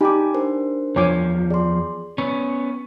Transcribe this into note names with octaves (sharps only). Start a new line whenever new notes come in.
D#4 G4 G#5 A5 B5 D6
D4 A#4 C5
E2 F3 C#5 G#5 D6
G#4 D5 C6
B3 C#4 C#6